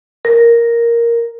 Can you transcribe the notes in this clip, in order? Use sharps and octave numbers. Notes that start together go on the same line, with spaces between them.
A#4